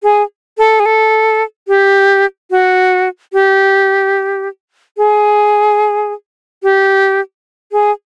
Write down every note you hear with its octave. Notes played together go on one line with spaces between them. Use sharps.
G#4
A4
G#4
A4
G4
F#4
G4
G#4
G4
G#4